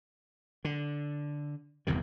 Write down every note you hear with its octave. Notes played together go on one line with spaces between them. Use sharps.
D3
G1 E2 C3 D#3